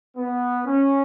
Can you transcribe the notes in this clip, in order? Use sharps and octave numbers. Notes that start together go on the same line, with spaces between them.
B3
C#4